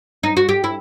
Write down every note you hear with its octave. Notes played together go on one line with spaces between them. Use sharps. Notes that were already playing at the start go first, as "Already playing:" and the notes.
D#4
F#4
G4
E4